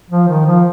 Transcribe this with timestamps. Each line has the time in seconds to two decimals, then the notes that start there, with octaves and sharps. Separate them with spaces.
0.11 F3
0.28 D#3
0.46 F3